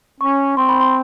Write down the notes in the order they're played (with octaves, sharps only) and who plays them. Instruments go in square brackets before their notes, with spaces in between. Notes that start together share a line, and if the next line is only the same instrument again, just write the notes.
[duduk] C#4 [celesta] C#6
[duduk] C4 [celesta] C6
[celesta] B5
C6